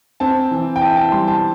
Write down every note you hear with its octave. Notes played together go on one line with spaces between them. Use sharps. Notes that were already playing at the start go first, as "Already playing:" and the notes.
C4 A5
E3
G5
E4 A5
A5
G3 C6
A5